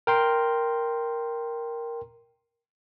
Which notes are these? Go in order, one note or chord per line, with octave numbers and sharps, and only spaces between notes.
A#4 G5 C6